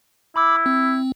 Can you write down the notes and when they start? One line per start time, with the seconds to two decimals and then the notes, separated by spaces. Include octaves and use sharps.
0.36 E4 B5 D6 E6
0.66 C4